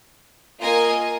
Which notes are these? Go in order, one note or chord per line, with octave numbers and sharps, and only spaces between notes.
A#3 F4 A#4 D#5 G#5